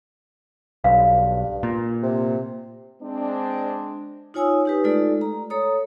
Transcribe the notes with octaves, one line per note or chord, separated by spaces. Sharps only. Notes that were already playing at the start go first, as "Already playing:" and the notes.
B1 G2 F5
A#2
C3
G#3 C4 D4
D#4 F4 C#5 G#5 D#6 E6
D#4 G4 B4
G#3 A3 D#4 F4 A4 D5
A#5
A4 C#5 A#5 D#6